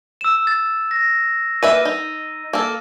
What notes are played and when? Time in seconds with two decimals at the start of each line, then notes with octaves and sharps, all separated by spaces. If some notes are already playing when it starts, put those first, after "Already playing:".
0.21 E6 E7
0.47 A6
0.91 A#6
1.63 A#3 B4 E5 D#7
1.85 D#4
2.53 A#3 A4